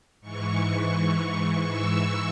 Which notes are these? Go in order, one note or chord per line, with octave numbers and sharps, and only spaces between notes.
G#2 E3 C#6
G#2 E3 C#6
E6